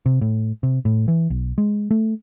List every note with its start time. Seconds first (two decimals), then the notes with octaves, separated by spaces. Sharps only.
0.06 C3
0.21 A2
0.63 C3
0.85 A2
1.08 E3
1.30 B1
1.58 G#3
1.91 A3